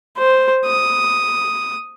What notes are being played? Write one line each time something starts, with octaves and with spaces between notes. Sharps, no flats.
C5
D#6